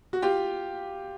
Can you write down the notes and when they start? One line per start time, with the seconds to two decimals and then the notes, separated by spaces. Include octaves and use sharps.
0.13 F#4
0.22 F4 G4